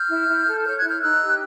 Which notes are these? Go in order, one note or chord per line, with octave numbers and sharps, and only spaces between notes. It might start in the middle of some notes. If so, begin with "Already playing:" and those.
Already playing: F6 G6
E4
E4
A4
C#5 F6 G6
F#6 G#6
E4
F6 G6
D#4 E6 F#6
G4